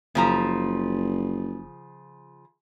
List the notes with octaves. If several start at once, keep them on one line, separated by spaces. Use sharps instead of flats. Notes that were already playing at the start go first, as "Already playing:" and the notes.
F#1 C#3 F3 A#5